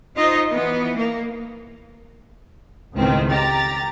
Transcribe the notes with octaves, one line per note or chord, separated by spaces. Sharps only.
D#4 F4 C5 D#5
E3 B3
A#3
C#2 A2 D#3 C4
G4 A#5 A6